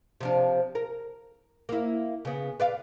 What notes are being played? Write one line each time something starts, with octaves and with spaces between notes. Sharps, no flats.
C3 F3 D4
A#4
A#3 E4
C#3 B3
B4 D5 F5